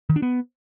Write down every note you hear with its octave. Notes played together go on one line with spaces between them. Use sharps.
D#3
D4
B3